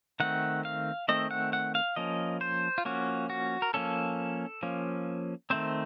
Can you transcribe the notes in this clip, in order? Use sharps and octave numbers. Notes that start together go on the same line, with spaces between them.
D#3 A3 C4 F#5
F5
D#3 A3 C4 D#5
F#5
F#5
F5
F3 A#3 C#4 D#5
C5
F4
F3 A#3 C#4 F#4
F#4
A#4
F3 A#3 C#4 A4
F3 A#3 C#4
D#3 A3 C4 C5